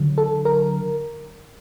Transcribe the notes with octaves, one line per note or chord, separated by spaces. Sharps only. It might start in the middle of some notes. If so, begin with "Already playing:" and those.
Already playing: D3 F#3
A4
A#4